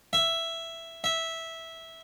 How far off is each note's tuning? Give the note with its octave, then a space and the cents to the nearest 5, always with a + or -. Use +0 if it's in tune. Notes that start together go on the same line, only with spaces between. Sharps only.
E5 +5
E5 -10